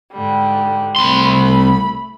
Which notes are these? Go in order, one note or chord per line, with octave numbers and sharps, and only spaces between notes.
G#2 D3 G3
C2 A3 B5 C6